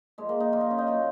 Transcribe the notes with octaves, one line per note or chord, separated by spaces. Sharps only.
A#2 F3 G#3
A#3
D#4
A#2 F3 F4
D#4
C#4
D#4
A#2 F#3 F4